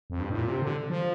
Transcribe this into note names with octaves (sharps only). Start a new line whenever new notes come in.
F2
G2
A2
A#2
C3
D3
F3